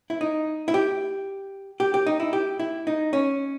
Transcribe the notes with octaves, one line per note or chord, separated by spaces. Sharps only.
E4
D#4
E4
G4
G4
G4
D#4
E4
G4
E4
D#4
C#4